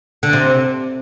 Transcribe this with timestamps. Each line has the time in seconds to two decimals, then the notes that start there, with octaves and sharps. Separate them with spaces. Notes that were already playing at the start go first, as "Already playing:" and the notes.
0.23 D3
0.33 C3